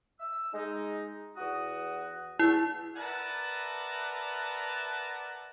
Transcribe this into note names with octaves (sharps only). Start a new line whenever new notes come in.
E6
G#3 D#4
E2 F#4 D#6
E2 A3 E4
A#4 B4 D5 E5 F#5 A5